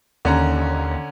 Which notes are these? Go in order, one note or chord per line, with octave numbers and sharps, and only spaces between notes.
D#2 D3 C#4 A#5